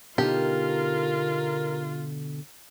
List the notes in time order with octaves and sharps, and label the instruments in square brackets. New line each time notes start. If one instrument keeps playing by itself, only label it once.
[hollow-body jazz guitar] B2 D3 D#4 [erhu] F4 [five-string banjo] G4 [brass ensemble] A#4